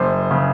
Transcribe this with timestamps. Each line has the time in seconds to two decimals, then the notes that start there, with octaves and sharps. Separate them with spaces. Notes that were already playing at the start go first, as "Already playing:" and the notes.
Already playing: F#1 C5
0.31 C#3